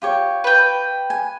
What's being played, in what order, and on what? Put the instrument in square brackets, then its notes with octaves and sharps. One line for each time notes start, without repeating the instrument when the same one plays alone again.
[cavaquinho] F4 G4 C#5
[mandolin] B4 G5
[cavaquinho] G#5